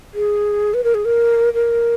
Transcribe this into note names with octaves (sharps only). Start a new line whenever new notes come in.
G#4
B4
A#4
G#4
A#4
A#4